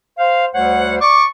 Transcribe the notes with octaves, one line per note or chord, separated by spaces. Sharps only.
C5 F5
D2 G3 C5 C#5 F#5
D5 C#6 D6